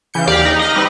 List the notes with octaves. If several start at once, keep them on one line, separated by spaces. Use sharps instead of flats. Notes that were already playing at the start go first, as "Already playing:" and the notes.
C#3 E3 G6 C#7
D#2 G4 D5 F5
D#4
D#5 F6
G3 C4 D#4 B4